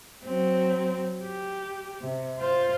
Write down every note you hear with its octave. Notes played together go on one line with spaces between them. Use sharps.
F#3 C4
G4
C3
F4 C5